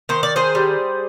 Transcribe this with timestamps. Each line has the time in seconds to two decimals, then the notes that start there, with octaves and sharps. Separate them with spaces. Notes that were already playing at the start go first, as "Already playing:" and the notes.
0.09 D#3 C5
0.23 D5
0.36 G#4 C5
0.55 G3